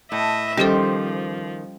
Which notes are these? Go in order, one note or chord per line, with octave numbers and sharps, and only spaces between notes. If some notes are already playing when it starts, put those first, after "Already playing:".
A2 D#5 E5
D#3 F3 G3 C#4 G4 A4 C5